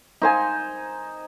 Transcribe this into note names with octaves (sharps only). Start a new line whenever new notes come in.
D#4 C5 G#5